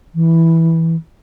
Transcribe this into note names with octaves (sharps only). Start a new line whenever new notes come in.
E3